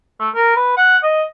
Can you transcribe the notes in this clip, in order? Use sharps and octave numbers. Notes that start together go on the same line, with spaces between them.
A3
A#4
B4
F#5
D#5